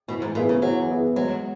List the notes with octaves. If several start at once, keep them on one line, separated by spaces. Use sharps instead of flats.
B2 E3
G#2
A#2 B3 E4 G#4 B4
C#3
E3 F#3
B3 E4 G#4 B4
F#3 G#3